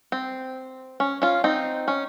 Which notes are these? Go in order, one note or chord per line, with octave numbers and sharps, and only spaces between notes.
C4
C#4
C#4 F4
C4 D#4
C#4